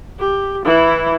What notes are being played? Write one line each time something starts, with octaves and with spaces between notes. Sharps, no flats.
G4
E3 E4